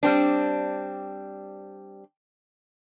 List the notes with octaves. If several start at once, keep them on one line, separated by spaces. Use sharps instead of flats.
G3 C4 D4